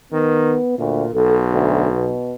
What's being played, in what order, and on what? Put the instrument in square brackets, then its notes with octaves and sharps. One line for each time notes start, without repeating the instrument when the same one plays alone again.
[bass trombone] D#3 [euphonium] B3
[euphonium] D2 [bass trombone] A#2
[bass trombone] B1 [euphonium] A4
[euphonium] D2
B2